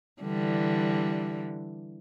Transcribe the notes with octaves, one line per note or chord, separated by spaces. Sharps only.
D3 E3 G3